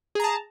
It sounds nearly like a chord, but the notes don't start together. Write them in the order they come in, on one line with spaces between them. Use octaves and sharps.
G#4 A#5 A5